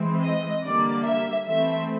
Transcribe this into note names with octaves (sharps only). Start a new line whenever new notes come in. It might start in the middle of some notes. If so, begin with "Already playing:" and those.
Already playing: E3 G#3 C4
D#5
D3 G3 A#3 D5
E5
E3 A3 C4 E5